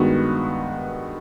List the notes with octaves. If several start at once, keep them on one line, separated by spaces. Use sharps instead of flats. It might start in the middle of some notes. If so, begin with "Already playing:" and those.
Already playing: G2 D#3 G#3 B3 F#4